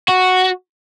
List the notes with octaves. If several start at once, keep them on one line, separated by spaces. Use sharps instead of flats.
F#4